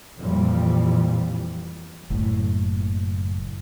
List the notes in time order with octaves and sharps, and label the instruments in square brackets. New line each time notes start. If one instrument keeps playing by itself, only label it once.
[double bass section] F2 A#2 E3 F3 G3
[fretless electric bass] F#1 A2